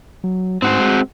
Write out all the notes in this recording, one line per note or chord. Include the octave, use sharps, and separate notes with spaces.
F#3
G#2 C4 F#4 C5
G#3